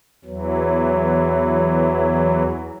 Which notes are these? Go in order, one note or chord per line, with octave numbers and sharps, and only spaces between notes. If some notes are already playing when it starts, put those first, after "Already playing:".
E2 E3 F#3